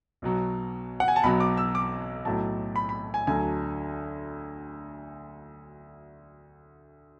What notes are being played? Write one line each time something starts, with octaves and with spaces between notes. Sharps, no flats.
B1 B2 F#3
F#5
G#5
A5
B1 B2 F#3 B5
D6
E6
D6
B1 A2 F#3 A5
B5
B5
G#5
D2 D3 F#3 G#5